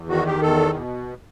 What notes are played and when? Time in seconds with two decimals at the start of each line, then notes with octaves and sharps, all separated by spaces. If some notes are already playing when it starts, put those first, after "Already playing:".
Already playing: E2
0.09 D#3 F#4
0.26 G4
0.41 E2 A4
0.74 B2